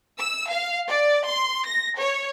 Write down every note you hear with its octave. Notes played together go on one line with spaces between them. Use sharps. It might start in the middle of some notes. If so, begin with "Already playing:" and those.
E6
F5
D5
C6
A#6
C#5